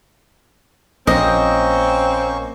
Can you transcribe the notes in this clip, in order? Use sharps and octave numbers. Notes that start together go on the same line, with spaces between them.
A#1 A#3 C4 C#4 D#5 C#6